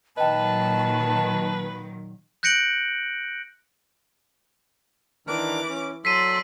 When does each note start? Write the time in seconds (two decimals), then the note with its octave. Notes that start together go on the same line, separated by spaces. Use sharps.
0.17 A#2 D#3 F#3 B4 D#5 G5 A5
2.43 F#6 G6 A#6 C#7 D7 F#7
5.27 D#3 E3 D4 A#4 D6
5.69 C#4
6.05 F#3 A4 D5 C6 E6 B6 C7 D#7